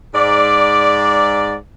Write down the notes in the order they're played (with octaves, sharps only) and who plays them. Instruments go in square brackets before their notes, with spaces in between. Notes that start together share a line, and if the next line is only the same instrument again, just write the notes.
[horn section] G#2 D5